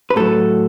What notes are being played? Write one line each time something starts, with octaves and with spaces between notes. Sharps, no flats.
B4
A2 F#3 A4